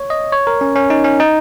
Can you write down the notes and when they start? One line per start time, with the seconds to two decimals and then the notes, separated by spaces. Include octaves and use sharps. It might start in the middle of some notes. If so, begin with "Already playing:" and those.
Already playing: C#5
0.10 D#5
0.32 C#5
0.47 A#4
0.61 C#4
0.75 C#4
0.90 D#4
1.04 C#4
1.20 D#4